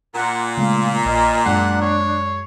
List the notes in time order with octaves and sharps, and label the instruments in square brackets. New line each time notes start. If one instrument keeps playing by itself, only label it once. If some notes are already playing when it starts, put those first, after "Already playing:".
[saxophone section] A#2 [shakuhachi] F#5
[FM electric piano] C#3 G#3 A3 [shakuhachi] F5
[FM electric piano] A#1 [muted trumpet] A#4 [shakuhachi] D#5
[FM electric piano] F#2 G#3 C7 [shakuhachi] D4 [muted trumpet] F#5
[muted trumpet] C#5